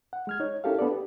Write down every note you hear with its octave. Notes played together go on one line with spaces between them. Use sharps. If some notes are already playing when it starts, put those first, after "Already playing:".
F#5
G#3 F6 G#6
D#4 C#5
C#4 E4 G4 A4 A#4 F5
B3 D4 A4 D5
G4